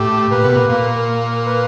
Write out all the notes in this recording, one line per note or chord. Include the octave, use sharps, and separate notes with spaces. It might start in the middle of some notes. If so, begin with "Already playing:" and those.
Already playing: A2 G4
A#2 B4
B2
A#2
A#2 A#3
A#3
B4